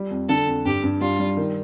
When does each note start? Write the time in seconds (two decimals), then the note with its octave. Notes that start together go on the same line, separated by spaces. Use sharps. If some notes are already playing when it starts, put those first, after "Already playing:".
Already playing: G3
0.11 F2
0.29 D3 A4
0.47 F2
0.65 G2 G4
0.84 G2
1.01 G3 F4
1.19 G3
1.37 D#3